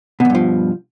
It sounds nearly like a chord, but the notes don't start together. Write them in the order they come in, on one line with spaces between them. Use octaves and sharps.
B2 E2 G2 F3